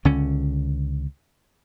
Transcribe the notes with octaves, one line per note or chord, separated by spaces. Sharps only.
C#2 D3 C#4